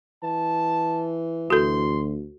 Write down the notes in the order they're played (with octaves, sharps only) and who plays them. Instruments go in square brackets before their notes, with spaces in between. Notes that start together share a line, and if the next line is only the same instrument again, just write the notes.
[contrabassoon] E3 [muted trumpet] A5
[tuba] D2 [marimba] F#4 A4 [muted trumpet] C6